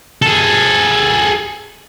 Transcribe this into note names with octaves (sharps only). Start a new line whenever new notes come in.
G#4 A4